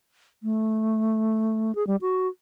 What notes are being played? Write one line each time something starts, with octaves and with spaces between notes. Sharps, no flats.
A3
G#4
G3
F#4